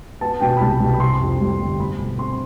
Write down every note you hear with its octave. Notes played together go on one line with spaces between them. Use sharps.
B3 A5
B2 G5
B5
C2 A5
C2
B5
C3 C6
F2
G3
G1
A3 B5
B2
C4 C6